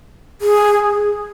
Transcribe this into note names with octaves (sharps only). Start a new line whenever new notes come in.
G#4